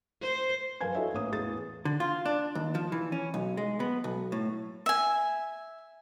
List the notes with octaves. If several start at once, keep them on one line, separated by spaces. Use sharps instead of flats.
C5
F#2 A#4 B4 F5 G#5 G#6
E4 F#4 A4 C#5 D#5 E5
A1 A#3 C#4 D#6
E2 A2 G#4 A6
D3
F4
D4
D#2
F3
E3
C#4
B1
G#3
B3
B1
A2
E5 G#5